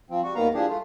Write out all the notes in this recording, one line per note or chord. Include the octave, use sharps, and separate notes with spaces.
F3 C4
G3 F#4
D#2 A#2 D#3 B3 F5 A#5
E3 F3 G3 D4 G4 G#4
A3 F4